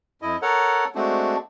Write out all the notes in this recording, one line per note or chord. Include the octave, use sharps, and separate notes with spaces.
F2 E4 D#5
A4 A#4 C#5 F#5
G#3 A3 C4 D4 F#4